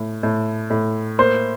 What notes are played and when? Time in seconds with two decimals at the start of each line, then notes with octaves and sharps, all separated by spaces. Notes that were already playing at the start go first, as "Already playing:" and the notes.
Already playing: A2
0.23 A2
0.70 A2
1.19 A#3 C5